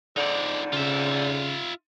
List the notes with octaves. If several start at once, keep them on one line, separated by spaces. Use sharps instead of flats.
F2 G#2 D3 D#4 D5
C#3 F4 E5